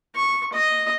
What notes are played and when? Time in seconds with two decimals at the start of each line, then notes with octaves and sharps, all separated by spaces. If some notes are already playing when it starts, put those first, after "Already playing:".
0.15 C#6
0.53 D#5